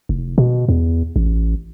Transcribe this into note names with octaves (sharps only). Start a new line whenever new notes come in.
F1
B2
E2
A1